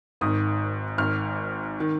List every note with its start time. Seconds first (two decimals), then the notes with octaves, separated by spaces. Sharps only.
0.21 G#1 G#2 D#3 D#6
0.98 G#1 G#2 D#3 F6
1.80 D#3